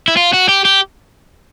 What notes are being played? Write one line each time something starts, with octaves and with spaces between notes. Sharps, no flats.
E4
F4
F#4
G4
G4